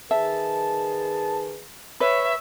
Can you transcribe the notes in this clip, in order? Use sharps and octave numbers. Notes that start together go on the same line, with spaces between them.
D#3 G#4 B4 E5 A5
B4 C#5 E5